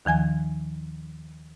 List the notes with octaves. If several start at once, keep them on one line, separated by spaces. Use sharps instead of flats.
D#2 D#3 F3 G#5 G#6